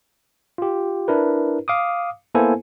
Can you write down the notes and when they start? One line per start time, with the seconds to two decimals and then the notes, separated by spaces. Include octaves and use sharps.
0.58 F4 G4
1.08 D4 E4 A#4 B4
1.68 F5 D6 D#6
2.35 A#3 B3 E4 A4 C5 G#5